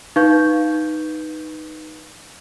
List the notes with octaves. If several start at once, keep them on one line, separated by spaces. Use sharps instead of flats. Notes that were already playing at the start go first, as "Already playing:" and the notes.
D#4 B4 F5 C#6 G6